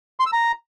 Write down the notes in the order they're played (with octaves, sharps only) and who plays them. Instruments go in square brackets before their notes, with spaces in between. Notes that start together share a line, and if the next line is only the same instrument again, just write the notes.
[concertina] C6
E6
A#5